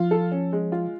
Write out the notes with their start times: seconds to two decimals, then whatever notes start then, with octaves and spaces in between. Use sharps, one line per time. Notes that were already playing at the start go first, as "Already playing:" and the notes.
Already playing: F3 F4
0.11 A4
0.32 C#4
0.53 G#3
0.72 F4